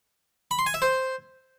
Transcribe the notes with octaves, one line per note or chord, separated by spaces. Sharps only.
B5
C6
G#5
E5
C5